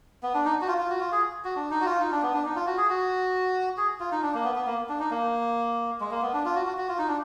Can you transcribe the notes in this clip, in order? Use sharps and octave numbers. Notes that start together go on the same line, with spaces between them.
B3
D4
D#4
F#4
F4
F4
F#4
F4
G#4
F#4
D4
D#4
F#4
F4
D#4
D4
B3
D4
D#4
F4
F#4
G#4
F#4
G#4
F4
D#4
D4
A#3
B3
B3
A#3
D4
D#4
A#3
G#3
A#3
B3
D4
F4
F#4
F#4
F#4
F4
D#4
D4